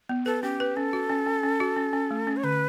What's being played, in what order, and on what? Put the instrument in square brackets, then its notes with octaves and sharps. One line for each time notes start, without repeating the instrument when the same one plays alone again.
[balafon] B3
[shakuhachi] A4 [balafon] B4
[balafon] C#4 [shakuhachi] G4
[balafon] B4
[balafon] C#4 [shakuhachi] A4
[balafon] F#4
C#4
C#4
C#4
F#4
C#4
C#4
A3
C#4
[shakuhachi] C#5
[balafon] D3 [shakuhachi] B4